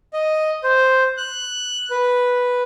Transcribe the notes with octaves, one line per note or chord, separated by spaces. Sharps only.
D#5
C5
F#6
B4